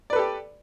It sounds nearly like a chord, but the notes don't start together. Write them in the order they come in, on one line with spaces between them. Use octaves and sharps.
D5 B4 A4 G4